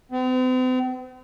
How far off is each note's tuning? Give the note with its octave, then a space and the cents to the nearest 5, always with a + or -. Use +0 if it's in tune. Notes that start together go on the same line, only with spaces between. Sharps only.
C4 -45